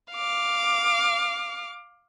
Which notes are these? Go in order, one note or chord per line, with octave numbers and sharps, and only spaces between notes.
F5 D6